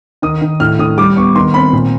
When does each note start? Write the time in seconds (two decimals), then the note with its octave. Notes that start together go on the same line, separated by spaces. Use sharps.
0.22 D#3 D#6
0.42 D#3
0.60 A2 F6
0.79 A2 D#6
0.97 G3 D6
1.16 B3 C#6
1.35 D#3 C6
1.54 C4 B5
1.73 A#2